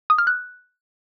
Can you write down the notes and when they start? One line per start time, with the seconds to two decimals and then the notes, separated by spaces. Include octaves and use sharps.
0.10 D#6
0.18 F6
0.27 F#6